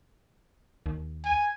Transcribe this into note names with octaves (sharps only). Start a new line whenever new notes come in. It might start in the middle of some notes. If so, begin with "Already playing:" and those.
D#2
G#5